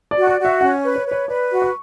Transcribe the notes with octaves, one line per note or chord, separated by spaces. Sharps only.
D5
F#4
D5
F#4
E5
C#4 F#5
B4
C#5
B4
C#5
B4 D5
F#4
C#6